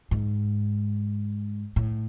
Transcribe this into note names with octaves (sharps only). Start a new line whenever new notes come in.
G#2
A2